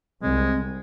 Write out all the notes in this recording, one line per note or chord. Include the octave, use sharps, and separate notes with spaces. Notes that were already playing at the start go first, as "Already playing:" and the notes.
C2 G#3 C4